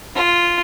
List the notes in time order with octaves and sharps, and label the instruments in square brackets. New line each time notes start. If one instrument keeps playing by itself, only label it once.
[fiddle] F4